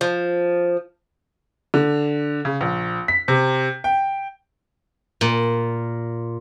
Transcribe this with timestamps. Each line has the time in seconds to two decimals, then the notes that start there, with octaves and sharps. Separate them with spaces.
0.01 F3
1.74 D3
2.45 C#3
2.61 A#1
3.08 B6
3.28 C3
3.84 G5
5.21 A#2